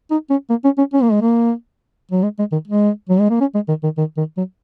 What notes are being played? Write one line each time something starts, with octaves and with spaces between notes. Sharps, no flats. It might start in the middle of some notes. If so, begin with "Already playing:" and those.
D#4
C#4
A#3
C#4
C#4
C#4
A#3
G#3
A#3
F#3
G#3
G#3
D#3
G#3
F#3
G#3
A#3
C#4
G#3
D#3
D#3
D#3
D#3
F#3